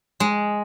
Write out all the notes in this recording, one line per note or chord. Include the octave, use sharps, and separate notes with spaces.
G#3